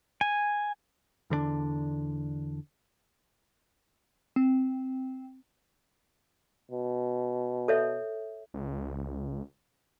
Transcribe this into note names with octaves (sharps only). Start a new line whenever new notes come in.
G#5
E2 D3 A3 D4
C4
B2
A4 C#5 E5
C#2